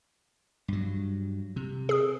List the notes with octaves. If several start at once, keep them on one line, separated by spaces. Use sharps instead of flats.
G2 F#3
C3
G#4 D#6